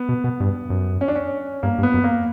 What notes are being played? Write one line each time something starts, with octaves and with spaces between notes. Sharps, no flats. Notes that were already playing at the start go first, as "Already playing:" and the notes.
Already playing: B3
B2
B2
G2
F#2
C#4
D4
C#4
G2 A#3
G2
B3
F#2
A#3